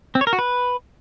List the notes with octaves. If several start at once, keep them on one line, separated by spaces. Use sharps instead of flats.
C4
C#5
A#4
F#4
B4